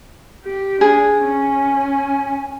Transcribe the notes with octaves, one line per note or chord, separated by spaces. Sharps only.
G4
D4 G#4
C#4 G#5